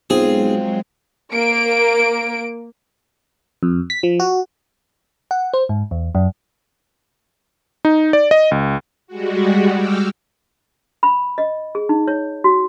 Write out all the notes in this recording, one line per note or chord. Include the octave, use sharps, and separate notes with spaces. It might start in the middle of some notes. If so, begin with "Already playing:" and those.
B1 F#3 G#3 C4 F4 G#4
A#3 D7
F2
B6
F3
F#4
F#5
C5
G#2
E2
F#2
D#4
D5
D#5
C#2
G3 G#3 F#4
G5 D6 E6 F6
B5
D#5
G#4
D#4
C#5
F#4